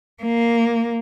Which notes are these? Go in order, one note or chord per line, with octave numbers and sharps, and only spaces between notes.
A#3